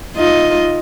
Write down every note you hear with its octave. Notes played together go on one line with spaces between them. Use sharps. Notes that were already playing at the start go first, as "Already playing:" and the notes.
D#4 F4 D#5